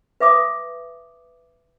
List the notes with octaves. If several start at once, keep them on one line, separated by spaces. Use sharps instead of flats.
B4 E5 D6 D#6